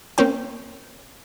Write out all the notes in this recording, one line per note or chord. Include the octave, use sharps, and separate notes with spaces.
A#3 C4 C#4 G5